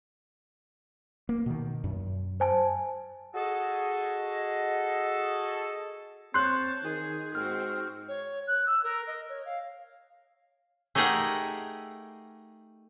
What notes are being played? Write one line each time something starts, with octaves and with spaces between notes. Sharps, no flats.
A#3
B2 D#3
F#2
C5 G#5 A5
F#4 G#4 A4 D#5
C4 C#5 A5 C6 F#6 G6
D#3 G#4
G#2 C4 F#4 F6
C#5
F#6
E6
A#4
D#5
C#5
F5
A3 D#4 G4 G#4 A#4 F#5